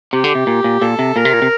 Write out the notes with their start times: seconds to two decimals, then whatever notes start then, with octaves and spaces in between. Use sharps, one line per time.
0.13 C3 G4
0.24 D3
0.35 C3
0.47 A#2
0.64 A#2
0.81 A#2 A4
0.99 C3
1.16 A#2 A#4
1.25 C3
1.33 A#2
1.42 C3